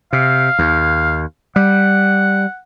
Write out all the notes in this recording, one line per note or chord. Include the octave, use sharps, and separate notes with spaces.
C3 F5
D#2
G3 F#5